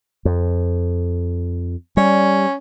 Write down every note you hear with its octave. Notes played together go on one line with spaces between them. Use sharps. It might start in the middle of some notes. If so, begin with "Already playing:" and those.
F2
G3 C#4